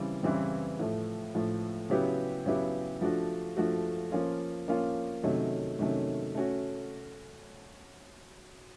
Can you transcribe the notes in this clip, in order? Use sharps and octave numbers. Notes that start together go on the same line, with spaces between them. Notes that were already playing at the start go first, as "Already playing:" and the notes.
Already playing: C#3 E3 G3 C4 E4
C#3 E3 G3 C4 E4
A2 F3 A3
A2 F3 A3
C#3 F#3 B3 E4 G4
C#3 F#3 B3 E4 G4
F3 A3 D4 F#4
F3 A3 D4 F#4
F3 A#3 C#4 F4
F3 A#3 C#4 F4
C3 D#3 F#3 A3 C#4
C3 D#3 F#3 A3 C#4
A3 C#4 F#4